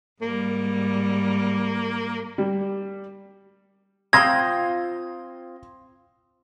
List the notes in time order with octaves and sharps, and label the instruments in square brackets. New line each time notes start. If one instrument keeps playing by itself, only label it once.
[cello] G#2 G3 [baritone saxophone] A#3
[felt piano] G3
[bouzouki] C4 F4 G5 [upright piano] C6 D#6 A#6 [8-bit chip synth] G#6